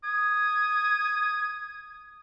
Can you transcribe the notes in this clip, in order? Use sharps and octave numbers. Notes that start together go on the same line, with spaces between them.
D#6 G#6